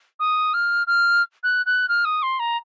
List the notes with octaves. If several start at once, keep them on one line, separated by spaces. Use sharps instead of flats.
D#6
F6
F6
F#6
F#6
F6
D#6
C6
A#5